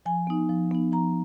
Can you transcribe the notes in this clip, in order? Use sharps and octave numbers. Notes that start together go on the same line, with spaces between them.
F3 G#5
B3 D#4
F3
B3 D#4
F3 A#5